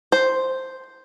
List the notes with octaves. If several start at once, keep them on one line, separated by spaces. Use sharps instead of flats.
C5